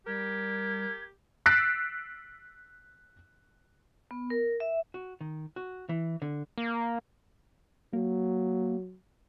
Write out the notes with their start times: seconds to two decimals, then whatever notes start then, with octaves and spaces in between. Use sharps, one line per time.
0.07 G3 G4 A#4 G#6
1.46 E6 F#6 A6 B6 C7 D7
4.11 B3
4.30 A#4
4.60 E5
4.94 F#4
5.21 D#3
5.56 F#4
5.89 E3
6.22 D3
6.58 A#3
7.93 F#3 A#3